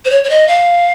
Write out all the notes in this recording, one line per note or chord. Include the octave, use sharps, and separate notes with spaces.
C5
C#5
C#5
D#5
F5